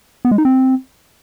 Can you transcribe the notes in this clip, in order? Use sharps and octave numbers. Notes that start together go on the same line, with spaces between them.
B3
G#3
D#4
C4